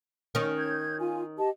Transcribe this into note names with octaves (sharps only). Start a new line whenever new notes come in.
D#3 C#4
G6 G#6
F4 G#5
G4 D#5 A5